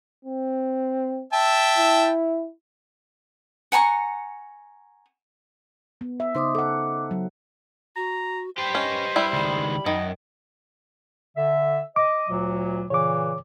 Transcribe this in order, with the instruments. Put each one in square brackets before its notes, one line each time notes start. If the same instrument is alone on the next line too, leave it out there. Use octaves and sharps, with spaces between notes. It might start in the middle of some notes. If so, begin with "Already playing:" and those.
[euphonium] C4
[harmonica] E5 G5 A5
[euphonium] E4
[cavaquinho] F#5 G#5 A#5 C#6
[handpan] B3
E5
[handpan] C#3 D#4 C5 [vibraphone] C6 D6 D#6
[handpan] A4 F#5 [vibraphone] D6
[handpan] F#3
[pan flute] F#4 [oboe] A#5
[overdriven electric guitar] G4 B4 [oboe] C5 [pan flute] G5
[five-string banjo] C#4 [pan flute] D#5
[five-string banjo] G3 E4 [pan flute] E5
[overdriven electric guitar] C#2 D#3 [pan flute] B5
[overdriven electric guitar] F#2 [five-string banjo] D#3 [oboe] D#5
[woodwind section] D3 E5
[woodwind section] D#5 [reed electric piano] D6
[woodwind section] D2 A#2 F#3
[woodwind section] A#2 C#3 E3 [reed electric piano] C#5 D6